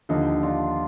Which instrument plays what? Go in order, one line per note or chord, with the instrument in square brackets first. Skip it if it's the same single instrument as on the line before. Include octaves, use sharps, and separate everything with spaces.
[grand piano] D#2 D3 F3 [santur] D#4
[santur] D4 F4